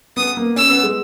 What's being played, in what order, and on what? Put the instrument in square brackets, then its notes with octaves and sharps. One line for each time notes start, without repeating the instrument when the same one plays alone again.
[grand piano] B3 [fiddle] D#6
[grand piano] A#3
[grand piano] C#4 [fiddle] E6
[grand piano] B3
G#3